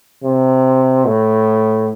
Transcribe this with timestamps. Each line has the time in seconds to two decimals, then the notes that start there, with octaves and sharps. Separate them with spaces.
0.23 C3
1.05 A2